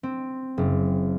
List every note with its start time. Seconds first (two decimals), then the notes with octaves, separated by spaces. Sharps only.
0.03 C4
0.58 F#1